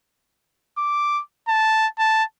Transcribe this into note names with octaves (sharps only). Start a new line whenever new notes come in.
D6
A5
A5